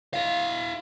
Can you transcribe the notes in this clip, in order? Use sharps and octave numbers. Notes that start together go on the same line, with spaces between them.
E4 F5